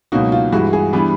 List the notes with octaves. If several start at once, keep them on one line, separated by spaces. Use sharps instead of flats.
C#2 B2 F#3 A#3 D#4 F#4
F4
G2 E3 G#3 F#4
G#4
E3 G3 B3 D4